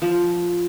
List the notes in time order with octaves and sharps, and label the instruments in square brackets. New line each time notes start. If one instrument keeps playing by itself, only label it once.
[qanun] F3